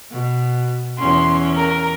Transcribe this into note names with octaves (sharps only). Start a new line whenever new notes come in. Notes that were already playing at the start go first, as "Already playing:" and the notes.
B2
E2 C#4 C6
A#4